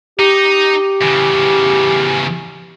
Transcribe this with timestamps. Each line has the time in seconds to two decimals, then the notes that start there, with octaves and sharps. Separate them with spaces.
0.19 D#4 G4
1.02 E2 C#3